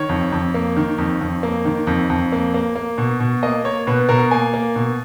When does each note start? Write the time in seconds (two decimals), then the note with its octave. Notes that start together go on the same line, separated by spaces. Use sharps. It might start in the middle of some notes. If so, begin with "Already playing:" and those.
Already playing: D#3 C#5
0.09 F2
0.32 F2
0.54 A#3
0.76 D#3
0.98 F2
1.21 F2
1.43 A#3
1.65 D#3
1.87 F2
2.09 F2
2.32 A#3
2.54 A#3
2.76 A#3
2.98 B2
3.20 B2
3.43 A#3 D#5
3.64 A#3 C#5
3.87 B2 B4
4.09 B2 A#4
4.31 A#3 G#5
4.54 A#3
4.76 B2